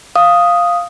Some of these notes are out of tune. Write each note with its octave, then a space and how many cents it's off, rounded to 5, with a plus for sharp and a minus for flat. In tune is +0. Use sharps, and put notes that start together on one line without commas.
F5 +0 D#6 +0